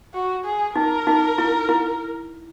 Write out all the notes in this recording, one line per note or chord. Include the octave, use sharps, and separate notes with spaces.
F#4
G#4
D#4 A#4
D#4
E4
E4